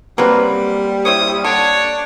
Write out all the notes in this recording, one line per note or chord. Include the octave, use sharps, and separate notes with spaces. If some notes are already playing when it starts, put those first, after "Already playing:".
F#3 G3 A#3 C4 B4
E4 C5 C#5 D#6
D3 D4 C#5